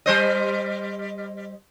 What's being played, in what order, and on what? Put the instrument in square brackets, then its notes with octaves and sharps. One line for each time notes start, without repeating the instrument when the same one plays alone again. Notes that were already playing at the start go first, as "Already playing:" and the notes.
[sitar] G3 C5 D#5